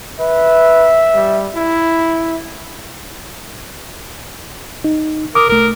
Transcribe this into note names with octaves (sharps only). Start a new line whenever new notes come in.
B4 E5
G3
E4
D#4
A#4 D6 D#6
C2 A3 A#4